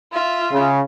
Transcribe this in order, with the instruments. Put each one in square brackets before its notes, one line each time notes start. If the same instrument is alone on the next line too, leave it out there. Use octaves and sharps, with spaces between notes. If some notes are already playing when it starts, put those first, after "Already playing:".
[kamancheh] F4 E5
[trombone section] C#3